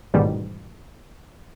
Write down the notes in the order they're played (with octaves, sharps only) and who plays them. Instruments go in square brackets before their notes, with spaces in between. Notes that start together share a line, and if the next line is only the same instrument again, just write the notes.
[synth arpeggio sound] A1 G#2 B2 D#3 G3